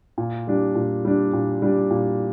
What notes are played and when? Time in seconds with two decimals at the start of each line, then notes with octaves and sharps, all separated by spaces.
0.18 A#2
0.47 G3 D4
0.75 A#2
1.05 G3 D4
1.33 A#2
1.62 G3 D4
1.91 A#2